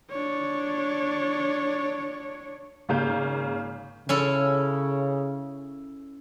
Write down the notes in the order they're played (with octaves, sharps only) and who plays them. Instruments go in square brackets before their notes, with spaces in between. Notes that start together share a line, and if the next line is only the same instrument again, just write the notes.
[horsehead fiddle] D4 C#5
[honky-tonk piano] G#1 C#3 A#3 F5 G6
[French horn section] C#3 [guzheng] C#4 E4 A4